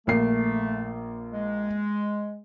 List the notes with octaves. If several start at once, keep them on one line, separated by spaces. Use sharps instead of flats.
A#1 A3 A#3 C7
G#3